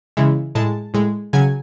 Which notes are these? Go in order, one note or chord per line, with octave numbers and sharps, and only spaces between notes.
C#3 E3 G#3
A2 G#3 A5
A2 G#3
C#3 F#3 G#5